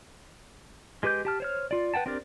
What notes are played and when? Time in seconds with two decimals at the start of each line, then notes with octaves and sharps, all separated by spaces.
1.03 G#3 G4 B4 D6 G6
1.25 G4 A5 F6
1.40 C5 C#5 F6
1.71 F4 D5
1.94 B4 F#5 G5 A5
2.06 C4 D4 G4 A#4 D5